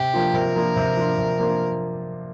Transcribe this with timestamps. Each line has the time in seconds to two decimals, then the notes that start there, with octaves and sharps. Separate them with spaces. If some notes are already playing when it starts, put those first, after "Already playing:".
Already playing: C3 G4
0.14 F3 A#3 D4 F4
0.34 C3 A#4
0.55 F3 A#3 D4 F4
0.77 C3
0.97 F3 A#3 D4 F4
1.18 C3
1.39 F3 A#3 D4 F4